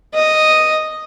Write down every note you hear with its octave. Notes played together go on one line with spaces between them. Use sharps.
D#5